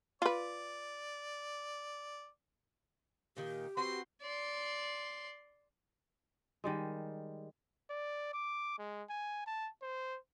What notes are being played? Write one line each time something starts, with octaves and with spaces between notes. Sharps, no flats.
F4 B4 D5
A#2 D#3 G4
C4 F#4 B4 C6
D5 C6
D#3 G3 G#3
D5
D6
G#3
G#5
A5
C5